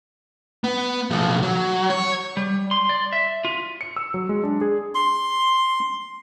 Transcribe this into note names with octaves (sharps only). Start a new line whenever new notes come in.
B3
B1 F3
F#3
C#5
G3
C6
D5
E5
F4
C#7
E6
F#3
G#3
D4
G#4
C6